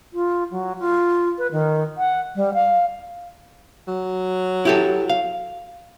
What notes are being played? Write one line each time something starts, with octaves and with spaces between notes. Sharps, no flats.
F4
F#3
F4
B4
D#3
F#5
G3
F5
F#3
E4 G4 A4
F5